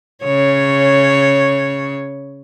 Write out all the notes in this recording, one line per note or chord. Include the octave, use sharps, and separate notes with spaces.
C#3 C#5